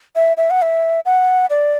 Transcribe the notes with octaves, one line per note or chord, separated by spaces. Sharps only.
E5
E5
F#5
E5
F#5
D5